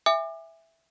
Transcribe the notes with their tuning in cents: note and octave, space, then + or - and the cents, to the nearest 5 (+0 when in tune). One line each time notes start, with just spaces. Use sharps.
E5 +0 G#5 -35 D6 +35